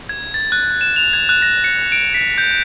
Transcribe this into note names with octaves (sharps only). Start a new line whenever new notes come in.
G#6
A6
F#6
E7
F7
G#6
F#6
A#6
C#7
D7
B6
G6